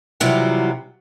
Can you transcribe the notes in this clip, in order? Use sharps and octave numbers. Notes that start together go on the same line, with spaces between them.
C3 E3 F#3 G3 F4 F#4